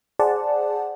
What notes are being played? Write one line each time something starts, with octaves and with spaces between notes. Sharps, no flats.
G#4 C5 D5 F#5 A5